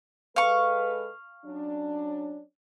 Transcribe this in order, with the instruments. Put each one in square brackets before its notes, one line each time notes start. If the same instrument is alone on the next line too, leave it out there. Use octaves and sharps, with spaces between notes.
[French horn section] G#3 A4 B4 [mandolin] F5 C#6
[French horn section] F#3 C#4 D4